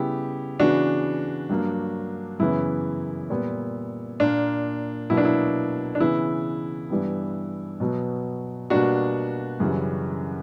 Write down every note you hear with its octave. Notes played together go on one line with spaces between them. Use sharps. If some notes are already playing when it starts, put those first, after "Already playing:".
Already playing: C#3 G3 B3 E4 G4
C#3 E3 B3 D4 F#4
G2 F#3 A#3
F#2 C#3 E3 B3 E4
A#2 G3 B3
A#2 A#3 D4
B2 F#3 A#3 E4
D4
E4
D4
C#3 E3 B3 E4
G2 E3 G3 B3
B2 F#3 B3
B2 G3 A#3 D4 F#4
F#2 C#3 E3 G3